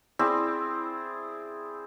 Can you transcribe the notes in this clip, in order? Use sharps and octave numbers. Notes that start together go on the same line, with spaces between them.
C4 E4 G#4 D5